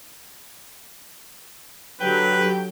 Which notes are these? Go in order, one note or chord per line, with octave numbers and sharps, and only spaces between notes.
D3 F#3 G4 B4 G5